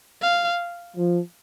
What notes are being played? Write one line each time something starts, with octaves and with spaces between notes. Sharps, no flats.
F5
F3